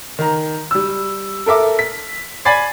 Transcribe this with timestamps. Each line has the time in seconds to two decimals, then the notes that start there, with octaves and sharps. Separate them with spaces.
0.19 D#3 A#5
0.71 G3 E6
1.46 A4 A#4 E5 D6
1.79 B6
2.45 D5 G#5 B5 G#6 A6 C7